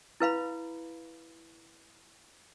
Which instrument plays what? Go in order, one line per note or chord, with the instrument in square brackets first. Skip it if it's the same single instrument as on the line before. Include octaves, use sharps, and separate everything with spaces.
[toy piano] E4 B4 F5 B5